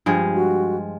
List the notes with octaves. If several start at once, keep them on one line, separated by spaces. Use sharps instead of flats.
G2 F3 G#3
F#4